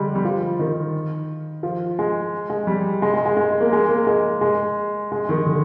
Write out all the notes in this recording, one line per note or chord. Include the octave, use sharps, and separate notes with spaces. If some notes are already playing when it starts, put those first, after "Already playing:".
Already playing: D3 G3 G#3
G3
F3
D#3
F3
G#3
G#3
G3
G#3
G#3
G#3
G#3
A#3
G#3
A#3
G#3
G#3
G#3
D#3
D3